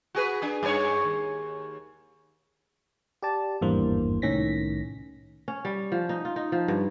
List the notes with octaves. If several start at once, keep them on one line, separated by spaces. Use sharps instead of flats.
F#4 G#4 B4
D4 G#4
G2 G#4 C#5
D#2
G4 D5 A5
G#1 E2 G2 E3 A#3 C5
C2 A2 D#3 C#4 A#6 B6
C#4
G3
F3
D#4
F4
D#4
F3
G2